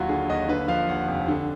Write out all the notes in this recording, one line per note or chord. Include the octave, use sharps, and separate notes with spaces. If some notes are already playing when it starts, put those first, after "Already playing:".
Already playing: D#2 F#3 F4 F#4
D3 G#4
D#2 D#5
D3 B4
F3 F5
D#2 F#5
F1
D3